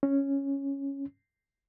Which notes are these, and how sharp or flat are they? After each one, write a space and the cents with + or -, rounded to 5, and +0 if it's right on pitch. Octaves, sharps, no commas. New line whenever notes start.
C#4 -5